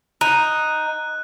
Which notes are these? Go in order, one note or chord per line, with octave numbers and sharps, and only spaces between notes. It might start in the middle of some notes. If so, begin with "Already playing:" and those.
D#4 F#6